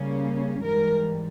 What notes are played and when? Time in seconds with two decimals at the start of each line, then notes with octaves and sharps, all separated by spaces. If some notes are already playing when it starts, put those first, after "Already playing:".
Already playing: C#3 G3 A#3 C#4
0.63 G#2 E3 G3 A#4